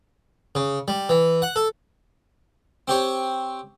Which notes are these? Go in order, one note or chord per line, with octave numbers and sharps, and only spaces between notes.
C#3
G3
E3
F#5
A4
C4 G4 C#5